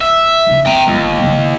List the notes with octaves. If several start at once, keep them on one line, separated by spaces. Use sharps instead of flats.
E5
D#2 C#3
C4 G5 A#5
G1 D#2 G#3
C#3 E4